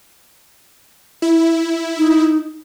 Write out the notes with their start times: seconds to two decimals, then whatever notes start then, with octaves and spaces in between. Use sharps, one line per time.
1.22 E4
1.98 D#4